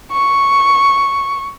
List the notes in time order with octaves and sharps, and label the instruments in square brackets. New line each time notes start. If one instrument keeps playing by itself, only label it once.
[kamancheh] C#6